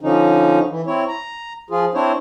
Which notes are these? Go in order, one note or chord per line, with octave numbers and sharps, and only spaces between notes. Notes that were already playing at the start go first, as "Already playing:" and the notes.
D3 F3 C#4 D#4
E3
C4 E4 C#5
A#5
F3 F4 G#4
C4 D4 E4 C5 C#5